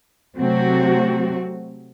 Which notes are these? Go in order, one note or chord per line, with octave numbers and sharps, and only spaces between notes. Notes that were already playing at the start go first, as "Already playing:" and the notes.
C3 F#3 A3 C4 F#4